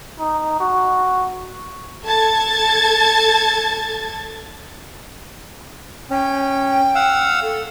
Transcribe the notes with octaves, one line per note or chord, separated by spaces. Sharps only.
D#4
F#4
A4 A5 G#6 A6
C#4 G5
F5 F#5 E6
A4